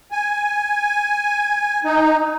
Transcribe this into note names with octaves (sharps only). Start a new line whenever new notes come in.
G#5
D#4